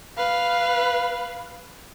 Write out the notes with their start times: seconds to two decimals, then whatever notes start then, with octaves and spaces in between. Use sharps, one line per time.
0.17 B4 F5